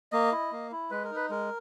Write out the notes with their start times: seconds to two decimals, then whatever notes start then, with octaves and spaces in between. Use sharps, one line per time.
0.12 A#3 D#5
0.32 E4
0.52 A#3
0.72 E4
0.91 G#3 B4
1.04 A#4
1.11 D#4 B4
1.30 G#3 A#4